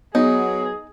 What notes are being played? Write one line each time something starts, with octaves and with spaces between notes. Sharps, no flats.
F#3 B3 D#4 G#4